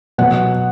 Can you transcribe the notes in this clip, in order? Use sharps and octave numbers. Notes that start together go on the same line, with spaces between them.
B2 F#3 F#5